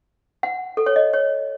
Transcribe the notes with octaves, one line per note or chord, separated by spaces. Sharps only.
F#5
A4
C#5
D#5
C#5